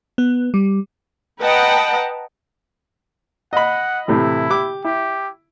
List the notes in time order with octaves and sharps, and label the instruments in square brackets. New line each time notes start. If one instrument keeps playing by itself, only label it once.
[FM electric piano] B3
G3
[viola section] B4 D#5 F#5 G5 A5 A#5
[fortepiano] D#5 B5 [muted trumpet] F#5
[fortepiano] A2 C3 E3 [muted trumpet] E4
[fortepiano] G4 D6
[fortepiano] E4 [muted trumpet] G4